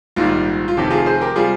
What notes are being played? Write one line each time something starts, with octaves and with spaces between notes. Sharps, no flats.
A#1 G#2 D#3 G3 F4
F4
F1 F2 C3 D#3 G4
F4 G#4
G#4 C5
G4 A#4
C3 G3 F4 G#4